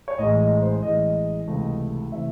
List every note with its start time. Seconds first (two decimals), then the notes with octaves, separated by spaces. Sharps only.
0.08 C#5
0.19 A1 A2 E3 G#3 D#5
0.40 D#5
0.61 C5
0.83 A1 A2 E3 G#3 D#5
1.47 C#2 C3 E3 A3
2.11 C3 E3 A3 E5